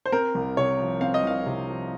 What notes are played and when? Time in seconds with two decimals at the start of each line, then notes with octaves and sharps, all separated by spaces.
0.06 C5
0.12 C4 A#4
0.35 C2
0.57 C3 C#5
0.79 F3
1.01 C4 F5
1.14 D#5
1.23 C2 F5
1.46 C3
1.68 F3